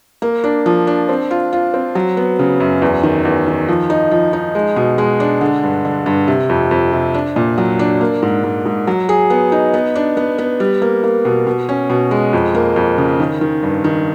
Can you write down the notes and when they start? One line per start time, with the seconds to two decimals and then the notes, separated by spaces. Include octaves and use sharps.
0.22 A#3
0.44 D4
0.66 F3
0.87 D4
1.09 C4
1.31 F4
1.53 F4
1.74 C4
1.95 F#3
2.17 B3
2.39 C#3
2.60 F#2
2.82 E2
3.03 D#3
3.25 E2
3.47 D#3
3.69 F3
3.90 D#4
4.11 F3
4.33 D#4
4.55 G#3
4.76 B2
4.98 G#3
5.20 D4
5.41 D3
5.63 G2
5.85 D3
6.06 G2
6.28 C3
6.49 F2
6.71 F2
6.93 C3
7.14 D4
7.36 A#2
7.58 F#3
7.79 D4
8.01 A#3
8.22 G#2
8.44 G#2
8.65 G#2
8.87 F#3
9.09 G#4
9.30 B3
9.52 D#4
9.74 B3
9.95 D4
10.17 B3
10.38 B3
10.60 G3
10.82 A#3
11.04 A#3
11.25 B2
11.47 B2
11.69 C#4
11.90 B2
12.11 G#3
12.33 F2
12.55 A#3
12.76 F2
12.98 C#3
13.20 D#3
13.41 D#3
13.63 G2
13.84 D#3